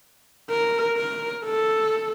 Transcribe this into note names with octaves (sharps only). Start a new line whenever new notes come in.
A#4
A#4
A4